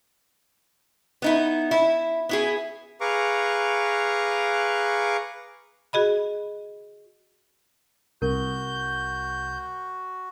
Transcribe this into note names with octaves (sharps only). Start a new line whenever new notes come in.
B3 D#4 E4
E4
B3 E4 G#4
G#4 B4 F5 A#5 C#6 D6
F#4 G#4 D#5 B5
C2 F#4 A#4 G6